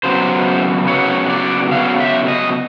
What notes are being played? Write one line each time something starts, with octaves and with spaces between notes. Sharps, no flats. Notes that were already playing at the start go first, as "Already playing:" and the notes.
C#3 F#3 B3 C5
C#3 F#3 B3 C#5
D5
C#3 F#3 B3 F5
E5
D#5